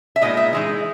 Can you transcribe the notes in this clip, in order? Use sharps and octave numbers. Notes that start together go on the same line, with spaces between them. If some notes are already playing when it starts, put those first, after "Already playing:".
E5
A#2 G#3 B3 D#4 D#5
E5
E3 G#3 D#4